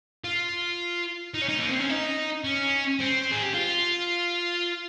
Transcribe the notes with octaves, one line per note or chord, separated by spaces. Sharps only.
F4
D#4
C#4
D#4
A#3
C4
C#4
D#4
C#4
C4
G#4
G4
F4